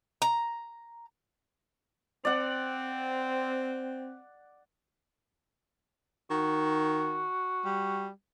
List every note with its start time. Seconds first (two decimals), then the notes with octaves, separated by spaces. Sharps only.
0.22 A#5
2.25 C4 D5 F#5
6.30 D#3 F#4
7.65 G3